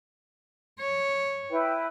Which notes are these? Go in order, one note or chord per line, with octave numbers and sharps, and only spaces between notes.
C#5
E4 B4 G5